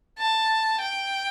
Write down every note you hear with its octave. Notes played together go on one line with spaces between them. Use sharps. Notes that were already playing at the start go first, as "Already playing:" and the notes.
A5
G5